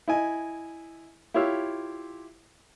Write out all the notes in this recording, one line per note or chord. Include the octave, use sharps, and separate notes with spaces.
E4 D#5 G#5
E4 F4 G4 C#5 F5 E6